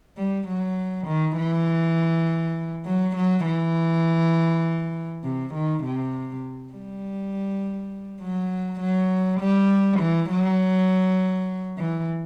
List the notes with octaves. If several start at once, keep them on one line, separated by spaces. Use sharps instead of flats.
G3
F#3
D#3
E3
F#3
F#3
E3
C3
D#3
C3
G3
F#3
F#3
G3
E3
F#3
E3